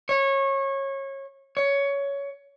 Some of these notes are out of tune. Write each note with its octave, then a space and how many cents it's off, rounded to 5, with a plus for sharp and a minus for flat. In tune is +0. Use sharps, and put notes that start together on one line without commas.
C#5 -25
C#5 +15